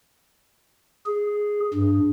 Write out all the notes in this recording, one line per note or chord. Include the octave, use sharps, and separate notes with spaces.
G#4
G2